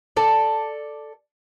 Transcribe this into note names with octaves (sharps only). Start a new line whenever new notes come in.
A4 D5